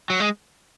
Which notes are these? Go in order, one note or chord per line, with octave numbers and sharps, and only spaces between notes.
F#3
G#3